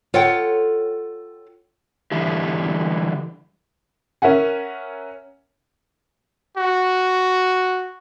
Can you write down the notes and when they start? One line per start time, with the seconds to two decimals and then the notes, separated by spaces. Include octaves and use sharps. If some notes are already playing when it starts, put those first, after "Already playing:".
0.14 F4 A4 C#5 F#5 G5
2.12 D3 E3 G3 E4 G4
4.22 C#4 A#4 E5 F#5 G#5
6.57 F#4